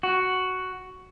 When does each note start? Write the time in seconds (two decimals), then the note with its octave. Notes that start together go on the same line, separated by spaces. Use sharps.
0.03 F#4